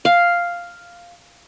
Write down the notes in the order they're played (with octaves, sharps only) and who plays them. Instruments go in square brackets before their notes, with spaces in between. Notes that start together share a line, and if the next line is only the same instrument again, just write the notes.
[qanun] F5